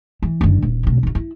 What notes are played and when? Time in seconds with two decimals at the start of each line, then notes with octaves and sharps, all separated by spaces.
0.22 E3
0.41 F#1 D3
0.62 D#1
0.83 D2 B2
1.03 D4 D#4
1.15 E4